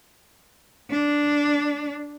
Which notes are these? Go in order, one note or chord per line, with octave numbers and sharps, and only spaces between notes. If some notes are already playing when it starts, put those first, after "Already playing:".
D4